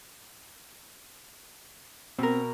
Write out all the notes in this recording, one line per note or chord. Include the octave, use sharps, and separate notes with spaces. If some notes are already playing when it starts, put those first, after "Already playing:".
B2 C4 A#4